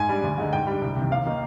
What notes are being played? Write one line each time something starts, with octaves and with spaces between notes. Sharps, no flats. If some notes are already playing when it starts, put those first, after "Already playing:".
Already playing: G#2 G#5
G3 D4
D2
D3 G#3 D#4
G#2 G5
G3 D4
C2
C3
D#3
D#2 F5
D#3 A#3 D#4